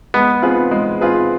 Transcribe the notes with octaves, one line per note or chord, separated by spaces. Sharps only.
G#3 B3
C4 F4 G#4 B4
G#3
C4 F4 G#4 B4